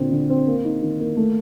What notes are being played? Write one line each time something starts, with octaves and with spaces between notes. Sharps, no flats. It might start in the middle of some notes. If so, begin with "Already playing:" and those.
Already playing: A#2 D3 C4
D3
C4
A#3
D#4
D#3
A#3
A3